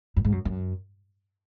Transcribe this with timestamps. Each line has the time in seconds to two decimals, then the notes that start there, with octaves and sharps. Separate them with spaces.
0.16 F#2
0.25 G#2
0.32 F#2
0.45 F#2